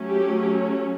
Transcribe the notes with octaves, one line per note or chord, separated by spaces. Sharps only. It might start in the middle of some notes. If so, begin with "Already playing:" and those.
Already playing: F#3 A3 C#4
G4